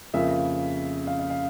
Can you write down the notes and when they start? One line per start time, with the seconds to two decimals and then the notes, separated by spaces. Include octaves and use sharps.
0.14 F2 C#3 F3 A#3 E5
1.07 F5
1.19 F5
1.30 F5